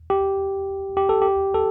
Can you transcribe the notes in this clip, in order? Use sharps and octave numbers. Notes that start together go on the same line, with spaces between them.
G4
G4
A4
G4
A4